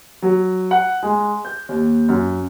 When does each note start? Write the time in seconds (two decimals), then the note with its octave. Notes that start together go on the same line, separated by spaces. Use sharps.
0.22 F#3
0.71 F#5
1.03 G#3
1.45 G6
1.69 D#2
2.09 F#2